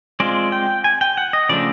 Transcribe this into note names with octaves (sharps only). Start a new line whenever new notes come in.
G#3 C4 F4 D5
G5
G#5
G5
F#5
D#5
C#3 F3 A3 D4 D5